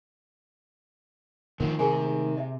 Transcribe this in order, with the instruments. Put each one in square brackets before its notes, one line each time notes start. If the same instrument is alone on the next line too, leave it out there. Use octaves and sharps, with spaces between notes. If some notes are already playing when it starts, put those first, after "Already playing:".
[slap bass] A2 G#3 A3 [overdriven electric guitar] D#3 F3 [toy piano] A#4 F#5
[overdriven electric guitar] C3 [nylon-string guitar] D#3 [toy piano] G#4 A#4 G#5
[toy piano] D#5 E5 G5